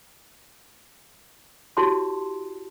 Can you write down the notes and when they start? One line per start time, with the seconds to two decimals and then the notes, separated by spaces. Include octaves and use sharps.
1.77 E4 F#4 G4 C#5 A5 C6